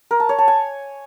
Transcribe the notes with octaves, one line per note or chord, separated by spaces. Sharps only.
A#4
A5
C#5
A5
G#5